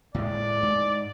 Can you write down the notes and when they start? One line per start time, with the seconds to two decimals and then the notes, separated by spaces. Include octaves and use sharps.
0.14 A2 G#3 D5
0.63 G#2